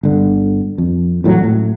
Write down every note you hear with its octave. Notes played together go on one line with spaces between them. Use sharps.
G1 D3
F2
A1 A2 D#3 F#3
A2